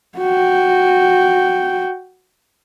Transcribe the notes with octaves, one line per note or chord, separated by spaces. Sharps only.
F#4 G5